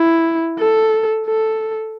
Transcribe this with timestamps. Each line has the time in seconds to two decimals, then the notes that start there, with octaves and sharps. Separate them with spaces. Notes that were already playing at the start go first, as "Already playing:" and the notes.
Already playing: E4
0.59 A4
1.27 A4